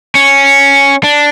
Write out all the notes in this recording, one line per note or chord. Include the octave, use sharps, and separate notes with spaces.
C#4
D4